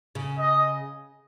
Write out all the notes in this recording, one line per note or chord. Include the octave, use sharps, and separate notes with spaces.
C#3
D#5